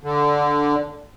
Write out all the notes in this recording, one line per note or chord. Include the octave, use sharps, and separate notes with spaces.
D3